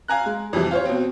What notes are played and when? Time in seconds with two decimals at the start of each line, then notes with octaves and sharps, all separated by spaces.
0.08 F5 G#5 A#5 F#6
0.26 G#3
0.53 F2 C3 E3 G3
0.71 F4 C5 C#5
0.85 B2 C4